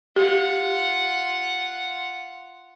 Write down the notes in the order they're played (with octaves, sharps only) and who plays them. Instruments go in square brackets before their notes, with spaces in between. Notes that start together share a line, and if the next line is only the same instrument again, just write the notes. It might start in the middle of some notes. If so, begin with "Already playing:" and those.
[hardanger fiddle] F4 F#5 [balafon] G4